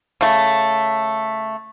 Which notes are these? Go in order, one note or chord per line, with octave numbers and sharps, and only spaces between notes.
C#3 A3